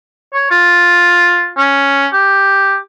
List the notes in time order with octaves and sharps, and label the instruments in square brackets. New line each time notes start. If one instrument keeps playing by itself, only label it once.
[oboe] C#5
F4
C#4
G4